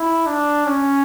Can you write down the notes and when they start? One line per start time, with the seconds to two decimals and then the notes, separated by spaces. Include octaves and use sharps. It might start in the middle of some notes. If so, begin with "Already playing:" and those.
Already playing: E4
0.26 D4
0.66 C#4